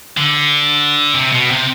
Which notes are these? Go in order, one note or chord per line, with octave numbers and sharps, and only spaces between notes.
D3
C3
B2
C3